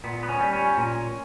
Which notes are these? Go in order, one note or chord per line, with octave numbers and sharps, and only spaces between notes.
A#2 B3
B3
C#4
G3
C#4
A#2